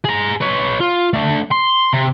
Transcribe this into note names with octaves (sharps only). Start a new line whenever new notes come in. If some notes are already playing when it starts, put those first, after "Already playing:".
G#4 A#5
B4 C#5
F4
A3 D4
C6
C3